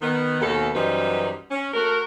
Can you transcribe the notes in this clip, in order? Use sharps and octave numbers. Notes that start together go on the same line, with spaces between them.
D#3 B3
D#2 B2 A4
F#2 E3 G3 D#4 B4 C5
C#4
A3 F#4 A#4